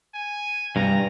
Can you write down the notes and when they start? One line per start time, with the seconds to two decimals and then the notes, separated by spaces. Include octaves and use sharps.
0.14 G#5
0.76 G2 C3 G3 C4 A#5